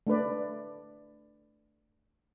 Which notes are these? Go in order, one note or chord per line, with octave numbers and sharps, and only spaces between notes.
A3 D4 B4 D5